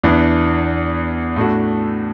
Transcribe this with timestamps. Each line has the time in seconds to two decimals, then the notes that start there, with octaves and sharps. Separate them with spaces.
0.03 E2 E3 D4
1.36 A2 A3 D4 F#4